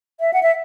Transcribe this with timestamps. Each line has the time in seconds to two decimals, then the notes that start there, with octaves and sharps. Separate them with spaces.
0.20 E5
0.33 F#5
0.43 E5